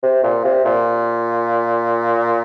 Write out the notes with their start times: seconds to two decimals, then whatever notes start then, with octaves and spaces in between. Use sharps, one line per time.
0.03 C3
0.23 A#2
0.44 C3
0.65 A#2